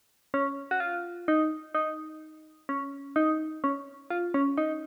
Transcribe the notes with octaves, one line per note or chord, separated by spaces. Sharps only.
C#4
F#4
F4
D#4
D#4
C#4
D#4
C#4
F4
C#4
D#4